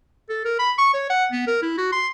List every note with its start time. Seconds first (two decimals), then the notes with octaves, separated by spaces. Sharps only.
0.29 A4
0.45 A#4
0.59 B5
0.78 C#6
0.94 C#5
1.10 F#5
1.32 B3
1.47 A#4
1.62 E4
1.78 F#4
1.92 C6